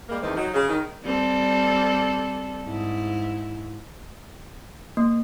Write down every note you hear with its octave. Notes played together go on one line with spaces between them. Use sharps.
G3 G#3 A#3
E2 D#3 A3 C4
F#3 D#4
C#3
D#3
G3 C4 A4
G#2 E4
A#3